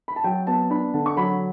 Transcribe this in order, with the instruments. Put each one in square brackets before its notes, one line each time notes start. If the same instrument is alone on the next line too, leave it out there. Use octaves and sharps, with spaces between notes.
[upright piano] B5
A5
F#3 G5
B3 A5
D4 B5
D3 A5
C#6
F#3 B5